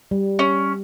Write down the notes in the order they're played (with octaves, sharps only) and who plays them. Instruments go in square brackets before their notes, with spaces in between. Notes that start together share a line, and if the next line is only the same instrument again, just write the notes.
[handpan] G3
[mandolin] C#4